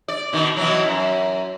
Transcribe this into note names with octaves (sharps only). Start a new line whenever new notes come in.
D5
B2 D#3
B2 E3 F#3
F#2